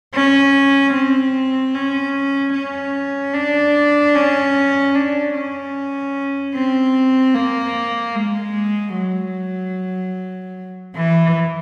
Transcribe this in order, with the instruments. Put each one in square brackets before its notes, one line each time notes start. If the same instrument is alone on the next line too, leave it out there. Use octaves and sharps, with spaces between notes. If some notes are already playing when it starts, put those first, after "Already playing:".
[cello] C#4
C4
C#4
C#4
D4
C#4
D4
C#4
C4
A#3
G#3
F#3
E3